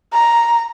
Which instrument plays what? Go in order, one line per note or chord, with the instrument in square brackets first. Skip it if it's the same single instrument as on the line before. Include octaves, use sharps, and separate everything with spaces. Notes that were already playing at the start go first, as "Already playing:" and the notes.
[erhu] A#5